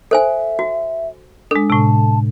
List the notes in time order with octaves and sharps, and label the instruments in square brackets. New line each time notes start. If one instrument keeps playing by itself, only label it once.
[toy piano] A4 C5 G#5 [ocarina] E5
[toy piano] F#4
[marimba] G#3 D4 [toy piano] A4
[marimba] A2 C3 [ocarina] A5